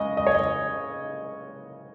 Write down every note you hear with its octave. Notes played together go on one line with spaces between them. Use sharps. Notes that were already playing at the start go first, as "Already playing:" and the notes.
Already playing: C#3 G#3 D#5
D#5
C#5
D#5